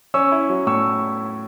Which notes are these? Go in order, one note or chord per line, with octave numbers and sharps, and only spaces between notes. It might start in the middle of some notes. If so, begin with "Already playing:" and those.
C#4 C#6 E6
E4
F#3
A2 C#6 E6